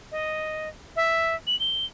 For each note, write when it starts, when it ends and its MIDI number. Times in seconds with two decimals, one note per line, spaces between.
0.12 0.69 75
0.96 1.35 76
1.47 1.58 102
1.60 1.85 103